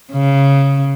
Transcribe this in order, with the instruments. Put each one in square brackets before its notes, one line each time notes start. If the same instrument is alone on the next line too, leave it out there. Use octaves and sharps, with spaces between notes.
[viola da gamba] C#3